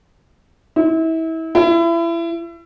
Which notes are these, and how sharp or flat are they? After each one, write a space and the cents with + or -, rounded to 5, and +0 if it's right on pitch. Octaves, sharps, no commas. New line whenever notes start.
E4 -30
E4 +30